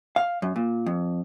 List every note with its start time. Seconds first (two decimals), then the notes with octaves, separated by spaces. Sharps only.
0.16 F5
0.42 F#2
0.56 A#2
0.86 F2